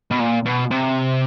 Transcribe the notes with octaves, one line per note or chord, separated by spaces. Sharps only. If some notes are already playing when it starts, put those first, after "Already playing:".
B2
A#2
B2
C3